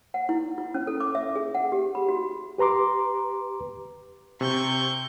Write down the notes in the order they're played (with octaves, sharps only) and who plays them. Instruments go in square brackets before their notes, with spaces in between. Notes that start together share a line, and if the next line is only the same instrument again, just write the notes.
[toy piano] F#5
E4
F4
C#4
A4
D6
E5
G#4
F#5
G4
B5
F#4
[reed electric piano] G4 B4 A#5 C6 D6
[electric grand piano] C3 [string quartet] C4 C#6 G6